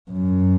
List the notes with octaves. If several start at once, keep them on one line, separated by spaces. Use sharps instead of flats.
F#2